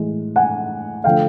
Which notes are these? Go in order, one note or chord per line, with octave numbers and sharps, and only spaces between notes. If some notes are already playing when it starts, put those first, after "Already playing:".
Already playing: A2 E3 G#3
F#5 G#5
D3 F3 A3 F5 G5